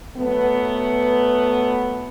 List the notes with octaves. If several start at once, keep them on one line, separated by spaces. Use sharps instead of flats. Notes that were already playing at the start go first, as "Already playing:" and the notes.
F#3 A3 B3